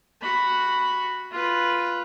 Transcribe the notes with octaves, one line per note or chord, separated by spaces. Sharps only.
F#4 B5
F4 B4